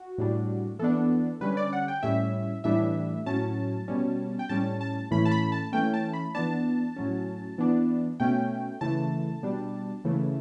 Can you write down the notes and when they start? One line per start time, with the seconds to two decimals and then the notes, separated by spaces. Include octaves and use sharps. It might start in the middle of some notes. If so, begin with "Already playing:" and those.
Already playing: F#4
0.18 A2 G3 D4
0.79 E3 B3 D4 A4
1.41 D3 G3 C#4 B4
1.57 D5
1.73 F#5
1.88 G5
2.03 A2 G3 C#4 E5
2.64 A2 E3 G3 D4 E5
3.26 A2 F#3 C#4 A5
3.88 B2 G3 C#4
4.39 G5
4.49 A2 G3 C#4 A5
4.81 A5
5.11 A2 E3 A3 C#4 B5
5.25 A5
5.31 B5
5.52 A5
5.72 E3 A3 C#4 G5
5.94 A5
6.13 B5
6.35 E3 B3 D4 A5
6.96 A2 F#3 C#4
7.58 E3 B3 D4
8.20 B2 A3 C#4 G5
8.81 C#3 E3 A3 A5
9.43 B2 G3 D4
10.04 C#3 E3 A3